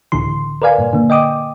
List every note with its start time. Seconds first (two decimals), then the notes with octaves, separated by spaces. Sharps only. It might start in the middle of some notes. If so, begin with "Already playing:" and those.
0.12 C#2 A2 D3 E3 C6
0.62 A#4 B4 D5 F5 G#5
0.78 G2 A#2
0.93 D3 A#3
1.10 D#5 G5 D6 D#6